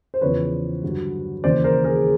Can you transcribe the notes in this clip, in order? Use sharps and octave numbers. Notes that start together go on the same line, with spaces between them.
C5
E2 C#3 F3 B4 C#5
G2 D3 F#3
D#2 C#3 E3 C5 D5
A#4 C5
G#4 A#4